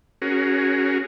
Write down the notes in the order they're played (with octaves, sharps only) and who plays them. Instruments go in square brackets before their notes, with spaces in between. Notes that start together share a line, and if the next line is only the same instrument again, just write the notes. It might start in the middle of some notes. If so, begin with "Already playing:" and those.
[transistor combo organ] C#4 F#4 G#4 A#4